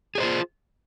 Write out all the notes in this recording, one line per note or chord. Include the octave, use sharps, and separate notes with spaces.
F4 G#4 C5 C#5